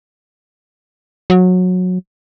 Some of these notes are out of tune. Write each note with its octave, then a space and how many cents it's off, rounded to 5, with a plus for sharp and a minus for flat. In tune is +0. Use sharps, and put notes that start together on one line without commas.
F#3 -20